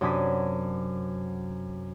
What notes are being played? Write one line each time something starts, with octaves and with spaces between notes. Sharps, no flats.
F#2 C3 D4 D#6 G#6 B6